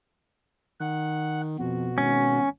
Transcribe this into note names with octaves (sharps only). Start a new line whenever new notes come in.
D#3 F#5
F2 B2 F#4
G#1 C#4